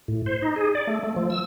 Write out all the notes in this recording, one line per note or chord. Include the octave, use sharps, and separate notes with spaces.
A2
C5
D#4
G#4
D5
A3
A3
F3
E6